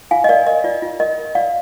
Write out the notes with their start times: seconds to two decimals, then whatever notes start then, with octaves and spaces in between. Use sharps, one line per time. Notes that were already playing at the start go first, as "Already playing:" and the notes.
0.11 F4 F5 G#5
0.24 D#5
0.29 A#4 D5 F5
0.46 A#4 D#5
0.64 F4 D5
0.82 F4
1.00 A#4 D#5
1.18 A#4
1.35 F4 D5 F5